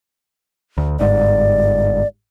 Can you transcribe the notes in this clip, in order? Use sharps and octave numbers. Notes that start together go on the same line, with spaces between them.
D2
G1 G#2 D5